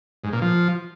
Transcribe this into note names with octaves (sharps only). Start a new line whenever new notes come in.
G#2
A#2
F3